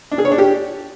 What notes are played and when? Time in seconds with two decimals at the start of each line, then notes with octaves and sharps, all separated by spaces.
0.11 D4
0.18 G#4
0.25 C#5
0.32 D4
0.38 G4